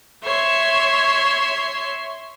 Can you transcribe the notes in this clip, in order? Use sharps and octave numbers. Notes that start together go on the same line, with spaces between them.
C#5 E5 C6